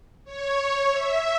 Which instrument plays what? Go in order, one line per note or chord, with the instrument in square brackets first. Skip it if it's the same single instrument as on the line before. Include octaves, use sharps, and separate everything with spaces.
[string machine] C#5
C#5
E5